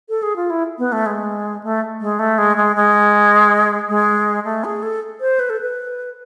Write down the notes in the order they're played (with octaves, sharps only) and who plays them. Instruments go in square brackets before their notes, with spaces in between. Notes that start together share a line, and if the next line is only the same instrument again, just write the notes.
[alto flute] A4
G#4
F4
E4
B3
A3
G#3
A3
G#3
A3
G#3
G#3
G#3
G#3
A3
G#4
A4
C5
B4
A4
B4